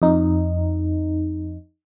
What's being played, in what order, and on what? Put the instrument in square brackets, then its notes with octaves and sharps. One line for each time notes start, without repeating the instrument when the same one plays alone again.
[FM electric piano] F2 D#4